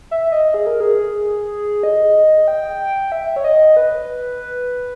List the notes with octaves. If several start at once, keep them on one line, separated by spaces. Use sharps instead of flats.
E5
D#5
G#4
A#4
G#4
D#5
G5
E5
C#5
D#5
B4